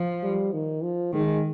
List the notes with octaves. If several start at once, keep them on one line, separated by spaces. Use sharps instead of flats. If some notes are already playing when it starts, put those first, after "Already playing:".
Already playing: F3
G3
D#3
F3
D#3 G#3